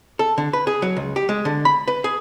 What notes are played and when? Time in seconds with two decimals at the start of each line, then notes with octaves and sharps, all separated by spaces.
0.19 A4
0.38 D3
0.53 B4
0.67 G#4
0.82 F#3
0.97 C#2
1.16 G4
1.29 G#3
1.45 D3
1.65 B5
1.88 B4
2.04 G#4